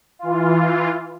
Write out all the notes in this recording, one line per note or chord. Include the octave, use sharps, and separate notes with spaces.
E3 F4